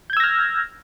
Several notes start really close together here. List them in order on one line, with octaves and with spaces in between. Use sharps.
G6 G#6 E6 A#6 F6